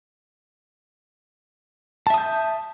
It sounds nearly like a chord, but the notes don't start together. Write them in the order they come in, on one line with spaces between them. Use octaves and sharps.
A5 E5 D#6 G6